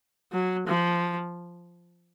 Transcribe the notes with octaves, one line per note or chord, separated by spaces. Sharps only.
F#3
F3